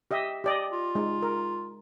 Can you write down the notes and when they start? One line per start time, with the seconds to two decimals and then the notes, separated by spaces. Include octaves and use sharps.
0.11 G4 D#5 E5
0.44 G4 D5 D#5
0.72 F4
0.95 G#3 D#4
1.22 A#4